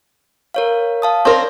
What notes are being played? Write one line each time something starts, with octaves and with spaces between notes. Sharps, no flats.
A#4 C#5 F5
F5 A5 D#6
C4 A#4 C#5 D5